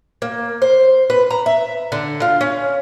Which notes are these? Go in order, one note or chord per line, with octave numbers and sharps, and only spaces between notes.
A#3
C5
B4
A#5
E5
D3
F4
C#4